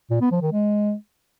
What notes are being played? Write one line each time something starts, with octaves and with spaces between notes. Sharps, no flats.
A#2
B3
F3
D#3
G#3